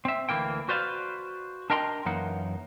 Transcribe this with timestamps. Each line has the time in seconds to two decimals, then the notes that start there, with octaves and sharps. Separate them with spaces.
0.05 C4 E5
0.29 D2 E3 A#3 G5
0.69 F#4 B4 C5 D5 F5
1.70 D4 A#4 D#5 G5 A#5 C6
2.06 F#2 E3 A#3 D#4 F#5